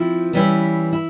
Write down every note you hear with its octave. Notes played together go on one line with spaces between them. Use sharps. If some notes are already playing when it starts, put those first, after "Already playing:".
Already playing: F3 C4 E4
E3 G3 C#4 E4
E4